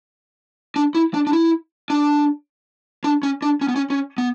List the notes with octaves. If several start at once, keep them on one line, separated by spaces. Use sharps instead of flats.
D4
E4
D4
D4
E4
D4
D4
C#4
D4
C#4
B3
C#4
C#4
B3